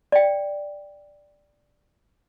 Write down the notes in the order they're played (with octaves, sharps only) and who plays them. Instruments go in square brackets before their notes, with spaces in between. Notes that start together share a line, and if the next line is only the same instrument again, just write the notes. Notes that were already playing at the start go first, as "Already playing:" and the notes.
[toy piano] D5 G5